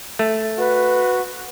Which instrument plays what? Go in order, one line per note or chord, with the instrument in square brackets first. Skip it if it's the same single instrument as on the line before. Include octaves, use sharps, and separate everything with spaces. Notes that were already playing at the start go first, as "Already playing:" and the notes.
[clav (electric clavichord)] A3
[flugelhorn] F#4 [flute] B4